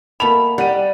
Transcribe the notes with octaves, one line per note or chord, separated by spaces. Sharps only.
B2 A3 A#3 B5 F7
G3 F#5 D#7